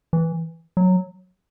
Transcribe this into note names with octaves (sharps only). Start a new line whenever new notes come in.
E3
F#3